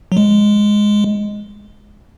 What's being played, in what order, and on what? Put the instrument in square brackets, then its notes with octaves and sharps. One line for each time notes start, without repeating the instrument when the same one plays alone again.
[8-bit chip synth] F#3
G#3